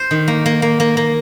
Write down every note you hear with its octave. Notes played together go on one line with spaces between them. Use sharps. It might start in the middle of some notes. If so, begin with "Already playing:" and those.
Already playing: C5
D#3
A#3
A#3
A#3
A#3
A#3